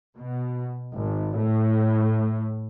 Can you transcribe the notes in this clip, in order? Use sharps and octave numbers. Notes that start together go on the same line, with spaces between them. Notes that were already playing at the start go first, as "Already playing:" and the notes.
B2
G#1
A2